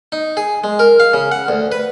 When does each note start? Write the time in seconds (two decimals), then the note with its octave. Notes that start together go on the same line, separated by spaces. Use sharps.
0.12 D#4
0.37 G#4
0.64 G#3
0.79 A#4
1.00 F5
1.14 C#3
1.32 F#5
1.48 D2
1.72 B4